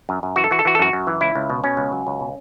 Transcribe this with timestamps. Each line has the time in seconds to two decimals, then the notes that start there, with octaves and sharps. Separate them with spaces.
0.09 F#2
0.23 F#2
0.36 E3 F#4
0.44 A4
0.51 E3 F#4
0.59 A4
0.65 E3 F#4
0.75 A4
0.79 F#2 F#4
0.93 F#2
1.07 E3
1.21 C#2 E4
1.35 C#2
1.50 B2
1.64 B2 C#4
1.77 C#2
1.92 F#3
2.07 C#2
2.20 B2